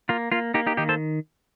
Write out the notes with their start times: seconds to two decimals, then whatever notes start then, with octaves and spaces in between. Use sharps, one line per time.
0.09 A#3 F4
0.32 A#3 F4
0.54 A#3 D#4 G4
0.67 D#4 G4
0.77 D#3 D#4 G4
0.89 A4 C5